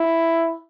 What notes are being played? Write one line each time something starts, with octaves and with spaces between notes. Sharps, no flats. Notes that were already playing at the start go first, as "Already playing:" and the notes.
Already playing: E4